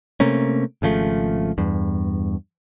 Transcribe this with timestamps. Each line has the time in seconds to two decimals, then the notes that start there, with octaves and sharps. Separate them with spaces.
0.20 C3 A3 A#3 C#4
0.82 G#1 C#3 F3 A3
1.58 E2 G2